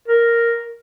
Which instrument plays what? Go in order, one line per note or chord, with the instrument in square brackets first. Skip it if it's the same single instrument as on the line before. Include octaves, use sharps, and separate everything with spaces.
[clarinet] A#4